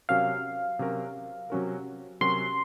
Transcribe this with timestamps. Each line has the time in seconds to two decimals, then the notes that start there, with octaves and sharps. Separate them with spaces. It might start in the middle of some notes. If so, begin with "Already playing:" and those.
0.09 C3 F#3 C#4 F#4 A#4 F5
0.79 C3 F#3 C#4 F#4 A#4
1.50 C3 F#3 C#4 F#4 A#4
2.21 C3 F#3 C#4 F#4 A#4 C6